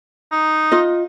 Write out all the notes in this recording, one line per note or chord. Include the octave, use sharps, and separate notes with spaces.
D#4
F4 D#5